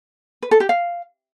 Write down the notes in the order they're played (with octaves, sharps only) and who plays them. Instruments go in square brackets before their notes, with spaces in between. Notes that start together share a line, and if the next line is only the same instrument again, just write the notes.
[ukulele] B4
A4
G4
F5